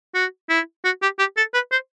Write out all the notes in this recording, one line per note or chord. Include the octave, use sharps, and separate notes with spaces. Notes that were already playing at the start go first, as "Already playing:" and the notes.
F#4
E4
F#4
G4
G4
A4
B4
C5